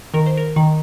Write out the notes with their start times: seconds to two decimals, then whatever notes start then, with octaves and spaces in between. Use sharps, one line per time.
0.14 D#3 A#4
0.26 C5
0.37 A#4
0.56 D#3